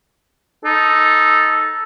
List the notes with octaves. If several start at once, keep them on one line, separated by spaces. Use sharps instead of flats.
D#4 A4